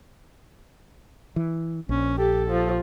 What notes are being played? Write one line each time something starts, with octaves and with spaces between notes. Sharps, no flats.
E3
A#1 C#4
G4 A4
F3